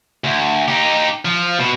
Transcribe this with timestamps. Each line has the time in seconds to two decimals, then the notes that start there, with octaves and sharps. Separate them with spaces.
0.24 D2
0.68 D#4 G4
1.25 F3
1.59 B2